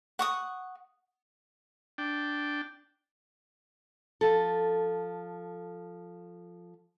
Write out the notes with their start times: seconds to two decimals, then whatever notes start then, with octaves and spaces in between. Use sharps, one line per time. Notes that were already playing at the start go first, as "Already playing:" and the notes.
0.19 F#5 C#6 D#6
1.98 D4 G5
4.21 F3 A4